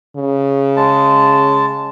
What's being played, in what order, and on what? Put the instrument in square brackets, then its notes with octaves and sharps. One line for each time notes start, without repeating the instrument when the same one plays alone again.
[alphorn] C#3
[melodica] G#3 A5